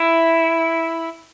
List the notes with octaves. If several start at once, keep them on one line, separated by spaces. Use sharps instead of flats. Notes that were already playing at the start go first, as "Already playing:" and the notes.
Already playing: E4